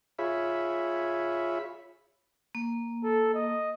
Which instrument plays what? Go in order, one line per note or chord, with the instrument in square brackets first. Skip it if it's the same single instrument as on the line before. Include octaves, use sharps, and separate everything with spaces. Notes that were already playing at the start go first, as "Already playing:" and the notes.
[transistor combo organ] F4 G#4 C#5 E5 B5
[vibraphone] A#3
[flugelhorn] A4
D#5